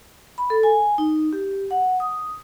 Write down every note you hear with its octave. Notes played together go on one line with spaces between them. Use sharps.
B5
A4
G#5
D#4
G4
F#5
D#6